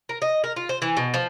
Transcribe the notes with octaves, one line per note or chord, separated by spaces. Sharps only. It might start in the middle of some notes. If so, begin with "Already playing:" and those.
A#4
D#5
A#4
F4
C5
E3
B2
F3